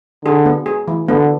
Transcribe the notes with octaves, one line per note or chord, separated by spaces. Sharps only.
D3 G#4
B3
G#4
E3
D3 B3